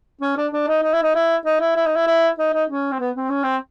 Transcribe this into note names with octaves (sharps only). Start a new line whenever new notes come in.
C#4
D4
D4
D#4
D#4
E4
D#4
E4
D#4
E4
E4
D#4
E4
E4
D#4
D#4
C#4
C4
B3
C4
C#4
C4